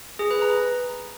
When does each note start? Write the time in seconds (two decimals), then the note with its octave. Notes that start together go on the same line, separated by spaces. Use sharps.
0.19 G#4
0.31 B4
0.42 A#5